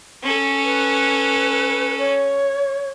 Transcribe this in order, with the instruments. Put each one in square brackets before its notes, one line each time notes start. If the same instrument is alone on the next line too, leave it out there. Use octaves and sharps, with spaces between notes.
[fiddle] C#4 A4
[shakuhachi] B4
C#5